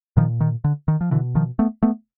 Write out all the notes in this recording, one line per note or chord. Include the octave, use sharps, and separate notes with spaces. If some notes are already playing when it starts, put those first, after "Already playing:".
A#2 D#3 F3
D#3
D3
D#3
F3
B2 D3 E3
D#3 F3
A3 B3
A3 B3